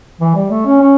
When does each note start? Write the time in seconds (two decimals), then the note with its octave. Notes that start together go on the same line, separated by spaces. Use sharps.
0.21 E3
0.35 G3
0.50 A3
0.66 C#4
0.81 C#4